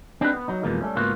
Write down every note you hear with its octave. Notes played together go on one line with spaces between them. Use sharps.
C4 D4 D#4 G4 A4 B4
B3
F#3 D#4
F2 B2 E3 F3 G#3 A#3
G3 A3 C#4
C#2 G#2 A#3 B3 F4 F#4